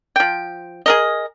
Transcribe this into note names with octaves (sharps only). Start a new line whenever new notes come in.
F3 G5
G#4 A#4 D#5